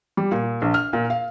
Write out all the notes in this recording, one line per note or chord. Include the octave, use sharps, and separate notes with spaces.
G3
A#2
A#1
F6
A#2
F5